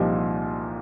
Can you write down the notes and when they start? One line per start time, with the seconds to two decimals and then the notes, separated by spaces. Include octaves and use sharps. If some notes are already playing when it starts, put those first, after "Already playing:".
Already playing: C2 A#2 F3 D#4 G4